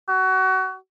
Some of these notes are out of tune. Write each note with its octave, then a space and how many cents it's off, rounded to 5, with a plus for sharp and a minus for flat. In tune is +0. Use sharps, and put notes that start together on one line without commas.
F#4 +25